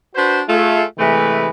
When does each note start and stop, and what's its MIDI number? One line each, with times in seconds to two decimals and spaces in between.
0.16 0.41 62
0.16 0.41 66
0.16 0.41 71
0.16 0.41 72
0.49 0.82 57
0.49 0.82 65
0.49 0.82 68
0.99 1.50 48
0.99 1.50 52
0.99 1.50 56
0.99 1.50 57
0.99 1.50 71